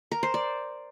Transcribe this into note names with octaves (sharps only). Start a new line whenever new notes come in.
A#4
C5
D5